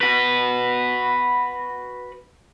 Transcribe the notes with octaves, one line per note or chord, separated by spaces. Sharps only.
F#4 B4